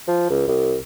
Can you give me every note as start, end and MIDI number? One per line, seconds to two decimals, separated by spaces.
0.08 0.28 53
0.30 0.43 37
0.48 0.76 36